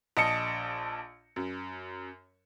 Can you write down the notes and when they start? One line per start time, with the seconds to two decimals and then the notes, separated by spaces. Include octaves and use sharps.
0.17 A#1 D#5 A5 C#7
1.36 F#2